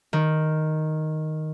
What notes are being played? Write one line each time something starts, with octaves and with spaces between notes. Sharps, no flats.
D#3